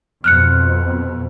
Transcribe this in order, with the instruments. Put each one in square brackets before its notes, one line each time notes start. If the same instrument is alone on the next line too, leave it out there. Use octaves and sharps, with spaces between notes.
[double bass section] F2 B2 [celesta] F6 F#6 C#7